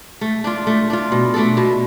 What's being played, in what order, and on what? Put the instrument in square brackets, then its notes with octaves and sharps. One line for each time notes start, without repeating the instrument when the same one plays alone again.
[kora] A3
D4 F4
A3
D4 F4
B2
A3 D4 A4
B2